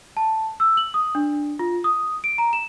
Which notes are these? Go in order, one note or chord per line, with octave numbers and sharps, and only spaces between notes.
A5
E6
F#7
D#6
D4
F4
D#6
D7
A#5
E7